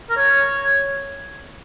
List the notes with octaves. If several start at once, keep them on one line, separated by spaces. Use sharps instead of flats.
A#4
C#5